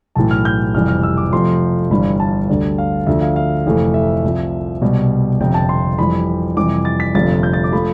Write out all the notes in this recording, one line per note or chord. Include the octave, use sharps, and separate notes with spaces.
B1 A2 E3 A5
F6
G6
F1 F2 E3 G3 F6
F6
E6
D6
F2 C3 F3 A3 C6
G1 G2 E3 G3 B5
A5
D2 D3 G3
F5
D2 D3 F3 E5
F5
F5
F1 F2 E3 A3
E5
C2 C3 F3
C2 B2 G3
G1 F2 C3 G5
A5
C6
F2 E3 G3 B5
F2 C3 E3 G3 D6
A6
B6
G1 F2 C3 F3 A3 A6
G6
A6
D6
F3 A3 B5